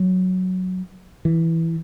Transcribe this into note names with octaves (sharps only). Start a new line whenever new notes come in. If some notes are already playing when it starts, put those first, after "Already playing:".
Already playing: F#3
E3